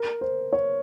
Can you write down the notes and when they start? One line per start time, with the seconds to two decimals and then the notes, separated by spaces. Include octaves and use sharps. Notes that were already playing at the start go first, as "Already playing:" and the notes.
Already playing: A#4
0.21 C5
0.53 C#5